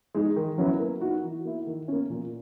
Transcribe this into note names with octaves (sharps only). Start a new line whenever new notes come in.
G#3 D#4 G#4
D#3
F#3 C#4 E4 B4
A#3
D#4 F#4
E3
A#3 E4
D#3
A#3 C#4
A#2